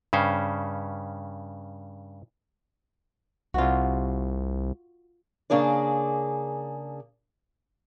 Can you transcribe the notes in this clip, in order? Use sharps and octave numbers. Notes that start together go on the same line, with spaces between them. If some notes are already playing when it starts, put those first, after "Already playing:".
G2 C#3 C#4 C5
C2 F4 F#4
C#3 A#3 D4 G#4 D5